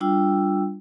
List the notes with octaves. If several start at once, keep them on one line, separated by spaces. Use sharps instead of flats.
G3 D4 F4 G5 E6